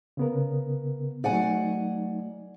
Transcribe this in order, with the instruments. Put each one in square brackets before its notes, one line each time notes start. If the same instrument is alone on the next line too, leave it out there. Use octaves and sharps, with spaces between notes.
[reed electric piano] C#3 B3 A#4
[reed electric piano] F#3 A3 D#4 [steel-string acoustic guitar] D5 F#5 G#5